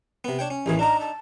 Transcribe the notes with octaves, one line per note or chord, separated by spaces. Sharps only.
C3 B3
D4 C#5 G5
C#4
A1 D#2 E3 G#4
D4 D#4 A#5
A5